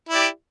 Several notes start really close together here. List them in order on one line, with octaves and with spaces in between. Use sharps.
E4 D5 G4